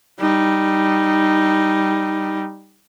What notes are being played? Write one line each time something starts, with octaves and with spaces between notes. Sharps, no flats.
G3 D#4